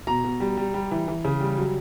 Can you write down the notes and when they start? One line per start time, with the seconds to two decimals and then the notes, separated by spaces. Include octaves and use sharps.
0.07 B2 A#5
0.24 B2
0.40 G3
0.57 G3
0.74 G3
0.91 E3
1.08 E3
1.25 C#3
1.40 G3
1.58 F#3